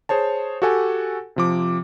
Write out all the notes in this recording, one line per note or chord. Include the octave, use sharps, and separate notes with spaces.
G#4 C5 C#5 A5
F#4 G4 A4 F#5 G#5
C3 F3 D6